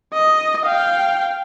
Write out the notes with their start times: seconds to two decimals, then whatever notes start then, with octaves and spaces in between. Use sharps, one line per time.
0.13 D#5
0.66 F5 G5